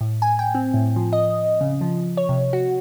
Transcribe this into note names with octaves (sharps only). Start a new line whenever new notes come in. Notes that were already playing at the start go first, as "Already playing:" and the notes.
A2
G#5
G5
C4
A2
F3
D#5
C#3
F3
C#5
C3
F#4